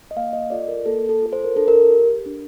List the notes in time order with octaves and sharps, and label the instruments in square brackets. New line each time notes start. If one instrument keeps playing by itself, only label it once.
[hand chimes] D#5
A#3 F5
D#5
F4 A4 D5
A#4
A#3 A4
A4
F4 A4
C5
A#4
D4 A4
A#4
G4
D4